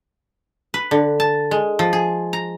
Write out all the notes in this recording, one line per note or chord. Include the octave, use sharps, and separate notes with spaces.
B4
D3
A5
G#3
F3
G#4
A#5